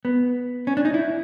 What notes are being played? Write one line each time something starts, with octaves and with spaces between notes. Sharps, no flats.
B3
C#4
D4
D#4
E4